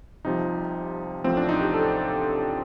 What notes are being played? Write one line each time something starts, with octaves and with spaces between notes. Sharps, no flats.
C2 C3 F3 D#4
A1 A2 F3 C4
D4
D#4
G4
A4